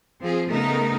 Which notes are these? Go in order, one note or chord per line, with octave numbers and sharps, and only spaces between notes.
F3 C4 F4 G#4
C#3 A3 B3 D#4 A#4